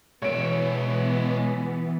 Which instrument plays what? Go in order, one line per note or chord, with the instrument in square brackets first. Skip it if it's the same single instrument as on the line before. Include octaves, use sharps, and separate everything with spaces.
[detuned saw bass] B2 [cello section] E3 B3 [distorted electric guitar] G#3 E5 [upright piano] C#5 D7